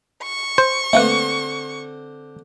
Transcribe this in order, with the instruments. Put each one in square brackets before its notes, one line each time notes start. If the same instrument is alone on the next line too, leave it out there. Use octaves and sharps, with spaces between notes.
[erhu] C#6
[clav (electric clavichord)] C5
[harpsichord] D3 C4 [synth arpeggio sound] A3 A#3 B4